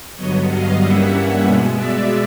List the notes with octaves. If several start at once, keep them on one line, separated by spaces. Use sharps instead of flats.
G2 D3 F#3 B3 C#5 D#5
D#5 F5
G2 E3 G3 A#3 C#4 E5 F#5
B2 G#3 B3
D5 E5